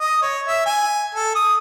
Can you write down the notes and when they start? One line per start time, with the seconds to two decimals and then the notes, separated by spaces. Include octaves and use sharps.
0.01 D#5
0.22 C#5
0.48 E5
0.66 G#5
1.15 A4
1.35 D#6